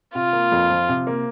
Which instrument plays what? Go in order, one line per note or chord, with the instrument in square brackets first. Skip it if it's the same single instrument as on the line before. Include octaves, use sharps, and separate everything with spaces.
[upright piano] C3 [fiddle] F4
[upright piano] A#3
F2
F3
C3
A#3